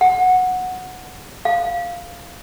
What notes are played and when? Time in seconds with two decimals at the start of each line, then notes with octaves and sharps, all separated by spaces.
0.01 F#5
1.45 F5